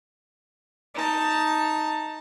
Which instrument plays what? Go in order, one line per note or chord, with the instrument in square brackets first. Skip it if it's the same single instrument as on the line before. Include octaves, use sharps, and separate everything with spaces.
[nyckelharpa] D#4 A5